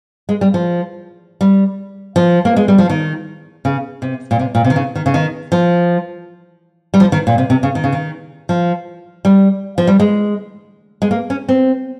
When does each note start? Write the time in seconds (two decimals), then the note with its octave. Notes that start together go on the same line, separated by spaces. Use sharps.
0.29 G#3
0.41 G3
0.54 F3
1.41 G3
2.16 F3
2.45 A#3
2.57 G#3
2.68 G3
2.78 F3
2.90 D#3
3.65 C#3
4.02 C3
4.31 A#2
4.39 C3
4.55 A#2
4.64 C3
4.70 D#3
4.76 C#3
4.95 D#3
5.06 C#3
5.14 D#3
5.52 F3
6.94 G3
7.00 F3
7.12 D#3
7.27 A#2
7.38 C3
7.50 C3
7.63 C#3
7.75 D#3
7.84 C#3
7.93 D#3
8.49 F3
9.25 G3
9.78 F3
9.87 G3
10.00 G#3
11.02 G#3
11.11 A#3
11.30 C#4
11.49 C4